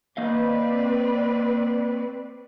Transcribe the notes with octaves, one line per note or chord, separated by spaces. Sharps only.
A#3 C4 B4 D5 D#5 F5